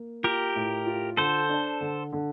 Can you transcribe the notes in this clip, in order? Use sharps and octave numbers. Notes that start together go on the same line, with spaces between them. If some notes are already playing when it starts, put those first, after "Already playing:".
Already playing: A#3
F4 G4 A#4
A2
F4
D3 A4 C5
D4
D3
D3